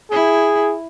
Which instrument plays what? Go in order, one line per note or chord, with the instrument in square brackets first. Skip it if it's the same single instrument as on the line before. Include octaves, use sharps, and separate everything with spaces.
[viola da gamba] E4 [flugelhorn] G#4